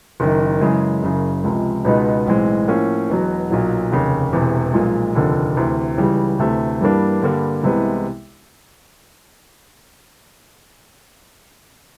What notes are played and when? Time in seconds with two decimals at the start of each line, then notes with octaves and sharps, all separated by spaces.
0.20 F#1 F#2 D#3
0.61 F#2 C#3 E3 G#3
1.03 F#1 F#2 C#3
1.44 C#2 C3 F3 G#3
1.85 C#2 B2 G#3 B3 D#4
2.27 B1 A2 E3 G#3 C4
2.68 A2 F3 A#3 C#4
3.09 E1 E2 B2 F#3
3.50 B1 A#2 F#3
3.91 F1 D#2 C#3
4.33 E1 E2 C3 E3
4.74 B1 A#2 F3 G#3
5.15 F1 D#2 D3 F3
5.57 D2 C3 E3
5.98 C#2 C#3 E3 G3
6.39 D2 C3 E3 A3
6.81 G2 E3 G3 A#3 D4
7.22 G2 D3 G3 A#3
7.63 C2 C3 E3 G#3 B3